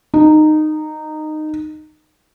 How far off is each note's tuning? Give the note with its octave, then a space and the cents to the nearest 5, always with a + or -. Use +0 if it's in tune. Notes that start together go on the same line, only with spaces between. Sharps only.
D#4 -15